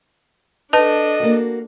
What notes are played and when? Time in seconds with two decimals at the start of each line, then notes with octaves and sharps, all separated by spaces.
0.73 D4 A4 B4 D#5 A5
1.20 A#3 F#4